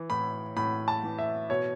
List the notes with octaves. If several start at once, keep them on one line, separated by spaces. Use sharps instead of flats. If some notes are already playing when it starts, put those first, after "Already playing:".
Already playing: E3
A2 B5
A2 B5
A5
E3
E5
B2 C#5